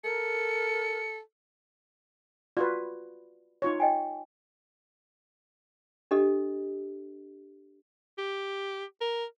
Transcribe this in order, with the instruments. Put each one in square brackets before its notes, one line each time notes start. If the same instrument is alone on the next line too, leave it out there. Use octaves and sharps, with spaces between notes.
[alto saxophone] A4 [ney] A#4 [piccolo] C#7
[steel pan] F4 F#4 B4 [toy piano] D5
[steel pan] D#4 F4 C#5
[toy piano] D#5 G5 G#5
D4 G4 A4 D#5
[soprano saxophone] G4
A#4